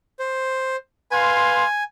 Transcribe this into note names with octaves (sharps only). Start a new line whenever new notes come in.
C5
B4 F5 G#5 C6